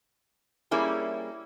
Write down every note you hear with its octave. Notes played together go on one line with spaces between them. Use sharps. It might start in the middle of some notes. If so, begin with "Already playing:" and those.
G3 A#3 C#4 E4 G#4